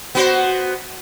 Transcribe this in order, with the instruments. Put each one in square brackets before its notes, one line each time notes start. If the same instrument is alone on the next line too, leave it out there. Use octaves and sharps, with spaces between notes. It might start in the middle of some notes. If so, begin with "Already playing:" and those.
[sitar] B3 F#4 C5